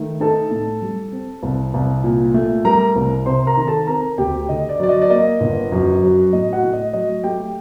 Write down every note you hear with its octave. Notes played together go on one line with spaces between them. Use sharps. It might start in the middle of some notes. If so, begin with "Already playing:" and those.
Already playing: D#3 A3
D#4 A4 A5
A2
G3
C4
C2
C2
A#2
A3
G3 A#4 A#5
C2
C3 C5 C6
A#4 A#5
D#3
A4 A5
C4 A#4 A#5
D2 G4 G5
D3 D#5
D5
F#3 D5
D#5
D5
A#3 D#5
G1
F#2
F#3
A2 D#5
F#4 F#5
A2
D#5
F#3 D#5
A3 G4 G5